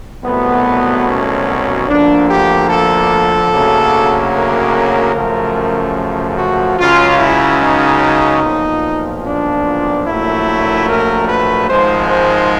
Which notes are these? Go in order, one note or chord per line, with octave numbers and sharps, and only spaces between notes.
C2 B2 F#3 A3 B3
C#4
D2 D3 F3 A#3 D4
G4
A4
D2 C#3 F#3 A#3
A#4
F#2 C#3 F3 A3
F#4
C#2 C#3 F#3 F4
E4
D#4
B1 A#2 F3
D4
A#1 A#2 F#3 A3 E4
A#4
B4
G#1 G#2 F3 G#3 C5
C5